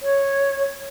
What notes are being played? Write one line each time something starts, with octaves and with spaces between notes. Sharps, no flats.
C#5